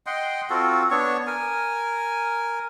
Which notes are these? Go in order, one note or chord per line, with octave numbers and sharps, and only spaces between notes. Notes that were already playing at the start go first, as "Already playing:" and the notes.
D#5 F#5 G5 C6
C4 F4 F#4 A4
B3 D4 C#5 C#6
A#4 G#5